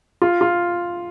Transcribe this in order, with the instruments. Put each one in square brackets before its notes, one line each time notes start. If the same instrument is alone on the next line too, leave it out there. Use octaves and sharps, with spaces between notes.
[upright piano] F4
F4